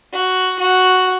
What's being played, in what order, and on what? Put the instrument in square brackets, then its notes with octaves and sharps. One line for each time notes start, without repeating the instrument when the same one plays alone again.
[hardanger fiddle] F#4
F#4